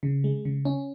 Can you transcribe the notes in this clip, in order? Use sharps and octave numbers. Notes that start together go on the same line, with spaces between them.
C#3
G#3
C#3
C#4